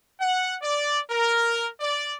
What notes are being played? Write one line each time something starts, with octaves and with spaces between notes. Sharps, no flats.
F#5
D5
A#4
D5